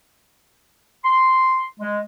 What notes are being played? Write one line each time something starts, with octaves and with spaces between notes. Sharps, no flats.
C6
G#3